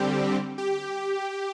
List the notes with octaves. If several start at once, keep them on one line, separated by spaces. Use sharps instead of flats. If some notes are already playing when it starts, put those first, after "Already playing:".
Already playing: D3 G3 C4 G4
G4